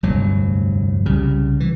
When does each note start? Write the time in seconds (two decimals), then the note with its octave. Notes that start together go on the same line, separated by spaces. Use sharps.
0.03 F1 D2 G2 F#3
1.06 C2 C#3 G3
1.60 E3